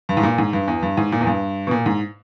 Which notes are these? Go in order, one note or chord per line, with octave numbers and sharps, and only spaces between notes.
G2
G#2
A#2
G#2
G2
E2
G2
G#2
A#2
E2
G2
B2
A#2
G#2